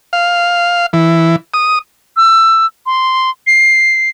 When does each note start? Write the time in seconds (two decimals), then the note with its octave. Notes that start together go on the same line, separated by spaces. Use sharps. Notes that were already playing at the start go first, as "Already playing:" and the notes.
0.13 F5
0.93 E3
1.54 D#6
2.17 E6
2.86 C6
3.47 C7